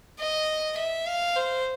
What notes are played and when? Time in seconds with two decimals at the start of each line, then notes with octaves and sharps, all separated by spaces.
0.19 D#5
0.78 E5
1.07 F5
1.36 C5